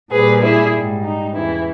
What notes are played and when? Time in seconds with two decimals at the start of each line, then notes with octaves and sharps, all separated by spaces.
0.11 A#2 G3 G#4 B4
0.43 E4 G#4
0.73 G#2 G3
1.04 D#4
1.35 E2 C#3 E3 E4